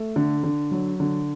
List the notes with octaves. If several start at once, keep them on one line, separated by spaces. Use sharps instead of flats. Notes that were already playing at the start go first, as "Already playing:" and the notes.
Already playing: A3
D3
D3
F#3
D3